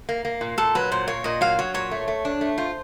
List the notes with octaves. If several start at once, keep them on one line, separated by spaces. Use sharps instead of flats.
A#3
A#3
A#2
A#2 A4
F#3 B4
A#2 C5
A#3 C#5
A#2 D#5
F#3 F5
F#3 C#5
A#2 C#5
A3
A3
D4
A3
F4 C5